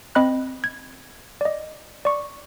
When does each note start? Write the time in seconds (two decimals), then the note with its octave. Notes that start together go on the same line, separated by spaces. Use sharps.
0.15 C4 D#5 B5 F#6
0.64 G#6
1.41 D5 D#5
2.05 D5 C#6